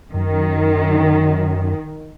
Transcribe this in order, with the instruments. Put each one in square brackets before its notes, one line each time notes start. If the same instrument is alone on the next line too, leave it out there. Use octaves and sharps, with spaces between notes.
[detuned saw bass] F#2 [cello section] D#3